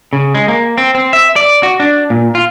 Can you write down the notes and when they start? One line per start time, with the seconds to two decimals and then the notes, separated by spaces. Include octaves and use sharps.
0.13 C#3
0.35 G#3
0.48 A#3
0.78 C4
0.95 C4
1.13 E5
1.36 D5
1.63 F#4
1.80 D4
2.10 A#2
2.35 F4